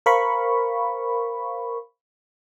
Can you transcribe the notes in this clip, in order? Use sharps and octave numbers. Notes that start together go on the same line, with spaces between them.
A#4 C5 F5 B5 C#6